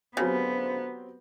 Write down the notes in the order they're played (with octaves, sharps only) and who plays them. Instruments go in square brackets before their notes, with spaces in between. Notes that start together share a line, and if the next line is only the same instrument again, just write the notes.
[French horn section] D2 C5 [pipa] C#3 [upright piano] F#3 C4 G4 [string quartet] B3